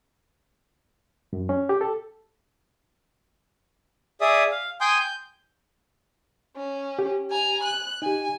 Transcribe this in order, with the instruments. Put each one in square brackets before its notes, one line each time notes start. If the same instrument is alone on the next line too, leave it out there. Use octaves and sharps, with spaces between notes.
[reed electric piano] F#2
C#4
G4
A4
[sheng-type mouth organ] G#4 D5 E5 D#6
F5
G5 G#5 C6 D#6 G6
G6
[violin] C#4
[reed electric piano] G4
[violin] G#5 A#5
F#6
[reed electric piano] D#4 G4 [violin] G#5